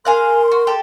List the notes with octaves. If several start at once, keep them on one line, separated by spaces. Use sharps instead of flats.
G#4 A#4 F5 C6 F#6
F#4
G4 A4